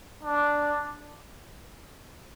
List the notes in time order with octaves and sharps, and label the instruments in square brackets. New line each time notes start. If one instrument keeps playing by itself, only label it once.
[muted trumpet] D4